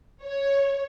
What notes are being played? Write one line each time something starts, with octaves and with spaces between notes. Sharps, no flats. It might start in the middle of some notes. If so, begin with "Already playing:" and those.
C#5